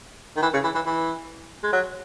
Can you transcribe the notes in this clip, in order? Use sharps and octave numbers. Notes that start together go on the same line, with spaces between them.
D#3
E3
C#3
E3
E3
E3
G#3
F#3